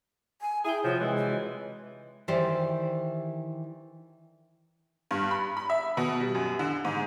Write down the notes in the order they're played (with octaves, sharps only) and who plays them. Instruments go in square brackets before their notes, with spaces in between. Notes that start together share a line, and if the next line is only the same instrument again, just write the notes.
[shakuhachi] G#5
[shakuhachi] E4 [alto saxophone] G#4 [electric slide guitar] G5 G#5
[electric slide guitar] C3 [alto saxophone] F3 [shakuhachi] F#4 [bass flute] C#5
[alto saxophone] E3 [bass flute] G#3
[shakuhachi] C#5
[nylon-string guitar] D#3 E3 E4 G4 C5 D5
[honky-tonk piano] G2
B5
B5
E5
B2
G3
F#2
D3
G#2